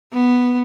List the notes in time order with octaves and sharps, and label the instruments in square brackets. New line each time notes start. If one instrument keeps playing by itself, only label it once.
[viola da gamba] B3